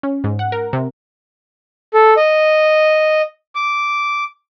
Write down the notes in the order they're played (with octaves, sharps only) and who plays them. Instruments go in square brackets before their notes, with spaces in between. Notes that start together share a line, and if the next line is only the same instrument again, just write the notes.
[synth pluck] C#4
G#2
F#5
A#4
C3
[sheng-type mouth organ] A4
D#5
D6